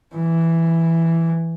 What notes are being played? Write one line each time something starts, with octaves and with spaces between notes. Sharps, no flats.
E3